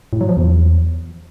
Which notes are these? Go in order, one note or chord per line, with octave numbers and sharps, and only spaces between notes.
A2
F#3
F3
E2